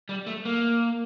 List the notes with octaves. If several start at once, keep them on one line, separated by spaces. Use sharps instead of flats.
G3
A3
A#3